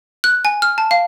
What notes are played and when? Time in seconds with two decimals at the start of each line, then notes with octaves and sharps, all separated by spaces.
0.24 F#6
0.45 G#5
0.62 F6
0.78 A5
0.91 F5